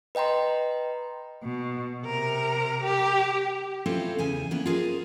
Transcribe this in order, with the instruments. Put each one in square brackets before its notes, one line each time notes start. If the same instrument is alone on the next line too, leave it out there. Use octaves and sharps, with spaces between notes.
[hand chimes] B4 D#5 G5 A#5 C6
[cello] B2
C3 A#4
G4
[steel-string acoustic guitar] C4 C#4 E4 F4 A4 C5
E2 C#3 G#5
E3 A#3 B3 C#4
F4 G#4 A#4 C5